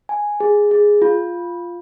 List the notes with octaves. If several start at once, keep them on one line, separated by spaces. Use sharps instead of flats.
G#5
G#4
G#4
F4